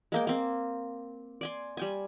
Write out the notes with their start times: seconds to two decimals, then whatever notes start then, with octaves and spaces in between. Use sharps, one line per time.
0.12 G#3 A#3 G5
0.27 A#3 C4
1.41 D5 G#5 C6
1.77 G3 G5 G#5